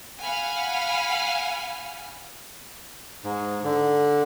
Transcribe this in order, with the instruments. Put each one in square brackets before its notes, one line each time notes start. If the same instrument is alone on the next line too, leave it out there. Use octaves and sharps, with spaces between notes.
[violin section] F5 F#5 G#5 B5 F6
[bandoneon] G#2
D3